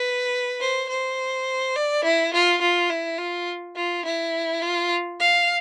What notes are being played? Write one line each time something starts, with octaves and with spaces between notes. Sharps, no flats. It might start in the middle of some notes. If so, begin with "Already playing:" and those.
Already playing: B4
C5
C5
D5
E4
F4
F4
E4
F4
F4
E4
F4
F5